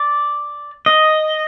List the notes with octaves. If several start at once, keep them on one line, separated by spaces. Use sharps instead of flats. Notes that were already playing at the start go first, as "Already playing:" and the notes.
Already playing: D5
D#5